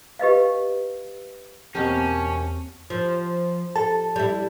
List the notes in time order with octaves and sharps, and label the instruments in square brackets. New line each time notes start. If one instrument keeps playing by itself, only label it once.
[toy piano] G4 B4 D#5 F5
[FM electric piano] E2 C4 [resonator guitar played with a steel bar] B2 A#3 G4 [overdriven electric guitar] C#4 [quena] A5
[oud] F3
[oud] A4 [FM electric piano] A5
[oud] G3 E4